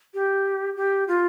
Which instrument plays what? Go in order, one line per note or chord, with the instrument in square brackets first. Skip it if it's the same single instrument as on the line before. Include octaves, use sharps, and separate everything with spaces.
[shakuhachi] G4
G4
F4